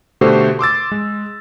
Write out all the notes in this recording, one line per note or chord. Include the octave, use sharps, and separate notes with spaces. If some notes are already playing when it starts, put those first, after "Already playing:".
B2 D3 A3 F#4 G4 C5
C6 D6 E6 A6
G#3